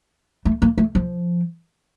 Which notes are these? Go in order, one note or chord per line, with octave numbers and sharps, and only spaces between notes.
A3
A#3
A3
F3